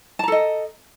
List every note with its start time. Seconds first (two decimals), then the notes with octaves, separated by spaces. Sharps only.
0.19 A5
0.24 A#5
0.28 A4
0.32 D#5